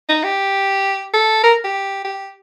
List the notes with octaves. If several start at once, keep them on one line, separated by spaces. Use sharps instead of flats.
D#4
G4
A4
A#4
G4
G4